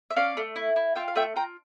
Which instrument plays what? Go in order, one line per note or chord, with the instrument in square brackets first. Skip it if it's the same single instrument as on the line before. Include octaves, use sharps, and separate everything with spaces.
[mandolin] E5
C#4 D5 F5
A3
E4
E4
F4 E5 G5
F5
A3 E5 G5
F4 G5 A#5